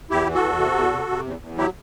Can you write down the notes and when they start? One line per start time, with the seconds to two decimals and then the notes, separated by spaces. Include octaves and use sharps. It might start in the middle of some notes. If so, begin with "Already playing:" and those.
0.10 E2 E4 G4
0.26 E3
0.35 F#4 A4
0.43 E2
0.59 C3
0.76 E2
0.92 C3
1.09 C3
1.26 E2
1.42 E2
1.57 F#3 E4 G4